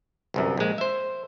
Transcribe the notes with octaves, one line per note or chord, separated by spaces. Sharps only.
G1 C2 F#2
A#1 G#3
C5 E5